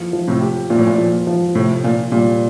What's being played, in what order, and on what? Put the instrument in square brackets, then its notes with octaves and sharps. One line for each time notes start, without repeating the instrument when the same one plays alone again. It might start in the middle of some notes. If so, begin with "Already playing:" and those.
Already playing: [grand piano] E3 F3 A#3
F3
[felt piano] A2 C3
[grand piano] G4
[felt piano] A#2 [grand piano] F3
[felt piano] A2
A#2
[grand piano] F3
F3
[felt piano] A2 [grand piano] C3
[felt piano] A#2 [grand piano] F4
[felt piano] A#2 [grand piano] G3